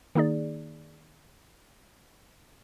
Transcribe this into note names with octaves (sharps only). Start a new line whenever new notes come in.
D#3 A#3 D#4 G#4 D5